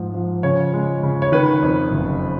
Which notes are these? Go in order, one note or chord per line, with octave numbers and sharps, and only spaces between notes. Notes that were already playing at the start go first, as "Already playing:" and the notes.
Already playing: G#2 F3
F3
C#3 C#5
G#3
C#3
C#5
D#3 B4
F2
F#1